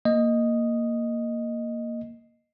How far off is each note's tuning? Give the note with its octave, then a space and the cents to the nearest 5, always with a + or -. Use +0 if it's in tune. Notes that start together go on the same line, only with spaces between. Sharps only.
A#3 +0 D#5 +0